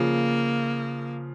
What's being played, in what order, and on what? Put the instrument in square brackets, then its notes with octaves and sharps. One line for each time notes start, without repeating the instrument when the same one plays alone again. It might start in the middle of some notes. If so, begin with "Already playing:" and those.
Already playing: [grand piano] C#3 F3 [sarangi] A#3